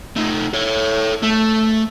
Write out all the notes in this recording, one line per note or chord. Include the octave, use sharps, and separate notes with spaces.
A3 D#4
A4 C#5
A3